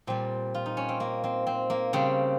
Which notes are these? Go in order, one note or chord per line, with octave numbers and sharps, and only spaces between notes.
A#2 G3 C4
F4
D#4
C#4
C4
A#3
C4
C4
A#3
C#3 G3 C4